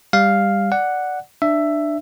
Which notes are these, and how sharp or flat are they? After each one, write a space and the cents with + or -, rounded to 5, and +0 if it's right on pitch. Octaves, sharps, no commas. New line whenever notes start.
G3 +20 F5 +0
D5 +0 F#5 +0
D4 +20 E5 +10